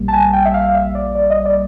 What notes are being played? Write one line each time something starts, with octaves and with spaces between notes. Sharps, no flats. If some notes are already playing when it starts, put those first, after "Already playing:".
Already playing: A#1 A#2 G3 A#3
A5
G#5
G5
E5
F5
E5
D5
D5
D#5
D5